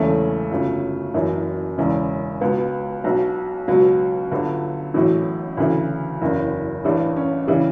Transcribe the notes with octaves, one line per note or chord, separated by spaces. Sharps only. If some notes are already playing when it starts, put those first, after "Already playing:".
Already playing: E1 E2 C#3 E3 A3
G1 F#2 C#3
F#1 F#2 E3
E1 E2 C#3
C#2 B2 B3
B1 B2
C#2 B2 F#3
G1 G2 D3
A1 A2 E3 F#3
D2 C#3 E3
F#1 E2 C#3
A1 G2 E3 G3
C#4
C#3 E3 G3